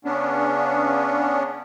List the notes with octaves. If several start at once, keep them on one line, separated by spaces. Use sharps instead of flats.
C#3 B3 C#4 D4